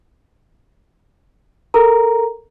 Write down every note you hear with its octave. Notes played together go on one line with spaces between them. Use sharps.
A4 A#4 A#5